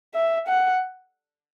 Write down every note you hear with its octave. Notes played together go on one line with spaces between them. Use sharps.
E5
F#5